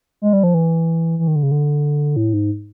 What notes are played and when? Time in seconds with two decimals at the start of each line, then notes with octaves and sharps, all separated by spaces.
0.22 G#3
0.33 G3
0.43 F3
0.54 E3
1.19 E3
1.27 D#3
1.36 D3
1.43 C#3
1.52 D3
2.16 A2
2.33 G#2